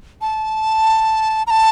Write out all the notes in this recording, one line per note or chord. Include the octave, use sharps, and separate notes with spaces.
A5
A#5
A5